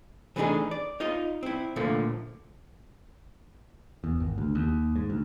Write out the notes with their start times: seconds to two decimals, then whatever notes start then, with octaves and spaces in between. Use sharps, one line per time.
0.36 E3 A3 B3 D4 D#4 G#4
0.71 D5
1.00 D#4 F4 D#5
1.43 C4 E4
1.76 A#2 D3 F3 A3 A#3
4.04 E2
4.20 G#1
4.38 D2
4.55 D#2
4.96 G#2
5.10 D2